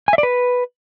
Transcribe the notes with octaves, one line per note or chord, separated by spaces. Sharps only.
G#5
E5
D5
B4